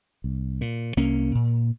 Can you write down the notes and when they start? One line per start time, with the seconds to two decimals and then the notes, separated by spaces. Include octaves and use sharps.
0.24 C2
0.61 A#2
0.97 C2 A#3 C#4
1.35 A#2